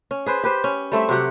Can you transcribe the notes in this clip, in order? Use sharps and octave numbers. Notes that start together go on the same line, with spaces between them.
C#4
G#4 B4 C5
G4 B4 C5
C#4
G3 A3 C4 E5
C3 F#3 G4 F#5